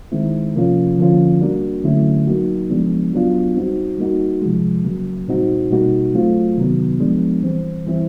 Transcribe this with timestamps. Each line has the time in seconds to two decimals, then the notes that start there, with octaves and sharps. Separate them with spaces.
0.12 D#3 G#3 C4 E4
0.55 C3 F3 A#3 C#4 F4
0.97 D3 F3 A#3 C#4 F4
1.41 G3 A#3 D4 F#4
1.84 D3 F#3 A3 C#4 E4
2.27 F#3 A#3 D#4 F#4
2.70 C#3 F3 G#3 B3 D4
3.13 F#3 B3 D4 F4
3.56 G3 C4 D#4 F#4
3.98 G3 A#3 D#4 F#4
4.42 C3 F3 G#3
4.85 C#3 F#3 A#3
5.28 A#2 G3 C4 D#4 F#4
5.70 B2 G3 A#3 D#4 F#4
6.14 F#3 A3 C4 F4
6.57 C3 D#3 F#3 B3
7.00 F3 G#3 B3 D4
7.43 E3 G3 C4
7.86 E3 G3 C4 E4